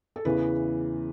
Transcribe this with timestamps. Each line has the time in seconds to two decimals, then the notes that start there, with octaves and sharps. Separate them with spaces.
0.16 A4
0.25 E2 C#3 E3 B4